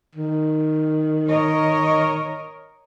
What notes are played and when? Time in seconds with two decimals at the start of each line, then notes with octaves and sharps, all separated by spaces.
0.15 D#3
1.28 A#4 C#5 D#5